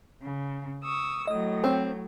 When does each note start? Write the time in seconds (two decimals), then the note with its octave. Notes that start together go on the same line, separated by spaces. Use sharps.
0.22 C#3
0.83 C#6 D#6 E6
1.27 A2 F#3 D#5 D#6
1.64 C4 C#5 G5